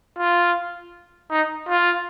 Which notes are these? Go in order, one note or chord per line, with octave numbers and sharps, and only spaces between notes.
F4
D#4
F4